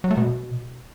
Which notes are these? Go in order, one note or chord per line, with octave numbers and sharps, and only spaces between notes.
F#3
A3
B2